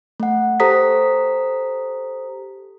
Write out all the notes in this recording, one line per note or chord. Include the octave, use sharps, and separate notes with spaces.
A3 F#5
G4 A4 C5 A#5 D#6 B6